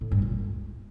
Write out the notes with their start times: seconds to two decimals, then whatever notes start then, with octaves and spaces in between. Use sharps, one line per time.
0.01 A2
0.11 G2
0.22 A#2
0.32 G#3